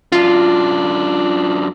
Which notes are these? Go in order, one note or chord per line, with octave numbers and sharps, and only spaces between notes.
F#2 D4 F4